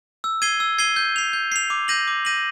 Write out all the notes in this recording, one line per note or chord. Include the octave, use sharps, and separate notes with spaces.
E6
G#6 C7 D#7 G7
E6
G#6 C7 D#7 G7
G6
C7 F7
G6
C7 F7
D6
G6 A#6 D#7 F#7
D6
G6 A#6 D#7 F#7